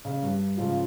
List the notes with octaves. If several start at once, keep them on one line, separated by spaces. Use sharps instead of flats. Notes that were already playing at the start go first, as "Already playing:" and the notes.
C#3
G2 G3
G#2 C#3 F3